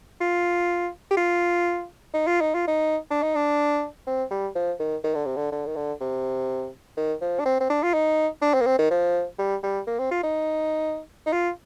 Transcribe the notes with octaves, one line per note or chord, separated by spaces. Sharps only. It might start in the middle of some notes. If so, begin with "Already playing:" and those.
F4
G4
F4
D#4
F4
D#4
F4
D#4
D4
D#4
D4
C4
G3
F3
D#3
D#3
D3
C3
D3
D3
D#3
D3
C3
D#3
F3
D4
C4
C4
D4
F4
D#4
D4
C4
A#3
C4
D#3
F3
G3
G3
A#3
C4
F4
D#4
D#4
F4